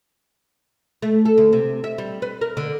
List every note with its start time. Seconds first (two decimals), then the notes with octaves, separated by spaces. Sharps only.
1.02 A3
1.25 A4
1.38 D2
1.53 C3
1.84 E5
1.98 G3
2.22 B4
2.41 A#4
2.57 D3